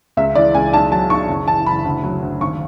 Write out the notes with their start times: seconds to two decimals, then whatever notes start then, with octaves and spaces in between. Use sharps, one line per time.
0.17 C#2 E5
0.35 E3 D5
0.55 C#2 G#5
0.73 B1 A5
0.92 F#3 A5
1.10 B1 C#6
1.29 F#1
1.48 E3 A5
1.66 F#1 B5
1.85 D2
2.03 F#3
2.22 D2
2.41 G#1 C#6